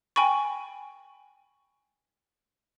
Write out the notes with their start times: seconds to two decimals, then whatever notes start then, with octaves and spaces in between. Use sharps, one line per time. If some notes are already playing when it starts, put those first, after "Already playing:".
0.16 G5 G#5 B5 C#6